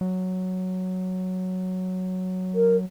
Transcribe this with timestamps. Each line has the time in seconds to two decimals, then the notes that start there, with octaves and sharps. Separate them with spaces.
0.01 F#3
2.55 A#4